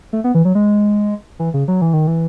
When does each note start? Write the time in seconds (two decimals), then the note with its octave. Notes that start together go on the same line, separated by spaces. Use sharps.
0.13 A3
0.24 B3
0.35 E3
0.45 F#3
0.55 G#3
1.39 E3
1.54 C#3
1.68 F#3
1.82 E3
1.93 D#3
2.07 E3